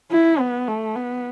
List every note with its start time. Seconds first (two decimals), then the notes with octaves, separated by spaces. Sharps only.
0.12 E4
0.39 B3
0.68 A3
0.96 B3